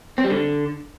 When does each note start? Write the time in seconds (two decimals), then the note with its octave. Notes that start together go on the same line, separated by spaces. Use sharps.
0.18 C4
0.24 G3
0.30 D3